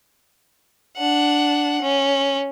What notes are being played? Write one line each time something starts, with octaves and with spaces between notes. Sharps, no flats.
D4 F#5
C#4